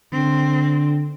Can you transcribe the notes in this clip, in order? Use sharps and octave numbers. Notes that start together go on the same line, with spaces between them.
D3 C4